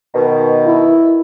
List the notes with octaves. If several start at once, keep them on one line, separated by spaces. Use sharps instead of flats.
B2 D#3
E4